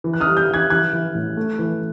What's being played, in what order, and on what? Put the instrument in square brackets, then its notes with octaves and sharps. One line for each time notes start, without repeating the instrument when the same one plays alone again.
[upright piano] E3
F#6
D#6 F6
G3
F6 G6
E3
F#6 G#6
E3 F#6 G#6
E3
A2
A3
E3